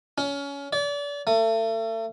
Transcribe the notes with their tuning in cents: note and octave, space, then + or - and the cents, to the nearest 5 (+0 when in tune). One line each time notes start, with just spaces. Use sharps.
C#4 +25
D5 -35
A3 +35